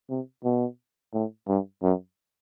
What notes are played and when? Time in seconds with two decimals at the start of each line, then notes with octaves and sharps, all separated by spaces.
0.10 C3
0.44 B2
1.14 A2
1.48 G2
1.83 F#2